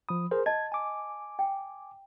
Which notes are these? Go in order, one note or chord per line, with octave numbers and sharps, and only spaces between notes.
F3 B5 D#6
G#4 A#4 C5
D#5 A5 G#6
G#5 D6
G5